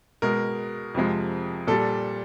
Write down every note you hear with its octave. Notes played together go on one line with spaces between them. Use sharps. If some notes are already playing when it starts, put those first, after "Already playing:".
B2 G#3 A#4
F2 C3 F3 G#3
A#2 G3 A4